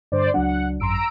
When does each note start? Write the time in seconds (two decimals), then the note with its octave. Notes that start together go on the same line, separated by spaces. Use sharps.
0.12 G2 D3 C5 D5
0.34 C#2 F#3 D4 F#5
0.80 G#1 F#2 A#5 C6 E6 D7